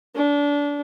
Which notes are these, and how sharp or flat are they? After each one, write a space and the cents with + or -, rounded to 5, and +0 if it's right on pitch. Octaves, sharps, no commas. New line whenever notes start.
D4 -25